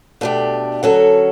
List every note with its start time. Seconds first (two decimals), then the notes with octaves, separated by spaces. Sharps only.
0.21 B2 A3 D4 G4
0.83 D3 F#3 C#4 F#4 A4